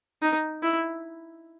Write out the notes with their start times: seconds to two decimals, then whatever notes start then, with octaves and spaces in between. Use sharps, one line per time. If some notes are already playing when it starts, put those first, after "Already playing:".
0.22 D#4
0.63 E4